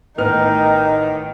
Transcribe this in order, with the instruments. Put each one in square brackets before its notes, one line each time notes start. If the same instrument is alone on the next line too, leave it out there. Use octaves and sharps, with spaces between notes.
[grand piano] A1 B3 F6 [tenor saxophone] D#3 [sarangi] D#4